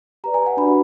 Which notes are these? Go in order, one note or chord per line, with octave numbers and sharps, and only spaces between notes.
G4 B4 D5 A#5
G#5
F#5
D4 F#4 B4 D5 B5